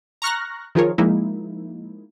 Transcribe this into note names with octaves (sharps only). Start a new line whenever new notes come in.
A#5 C#6 F6 F#6 A#6
D#3 F3 F4 G#4 A#4 C#5
F3 G#3 A#3 D#4 E4